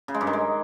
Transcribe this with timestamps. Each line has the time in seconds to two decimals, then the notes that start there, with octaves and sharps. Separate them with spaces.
0.08 C#3
0.14 G#3
0.21 G2
0.27 D#3
0.33 G#3